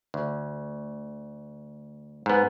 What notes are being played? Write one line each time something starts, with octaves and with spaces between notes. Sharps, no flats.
D2
G#2 B3